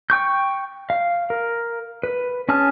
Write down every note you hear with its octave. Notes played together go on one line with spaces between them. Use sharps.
G5 C#6 G6
F5
A#4
B4
C#4 G#4 A5 F6